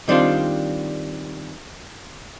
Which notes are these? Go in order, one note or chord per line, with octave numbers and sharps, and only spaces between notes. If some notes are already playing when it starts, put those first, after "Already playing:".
D#3 G3 C4 D4 F4